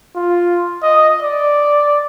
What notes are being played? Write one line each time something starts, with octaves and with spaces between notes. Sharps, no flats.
F4
D#5
D5